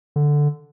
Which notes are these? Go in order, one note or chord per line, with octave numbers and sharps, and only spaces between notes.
D3